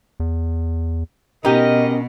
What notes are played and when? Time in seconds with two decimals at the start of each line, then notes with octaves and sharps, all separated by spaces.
0.20 E2
1.45 B2 C#4 D#4 G4 A#4 D#5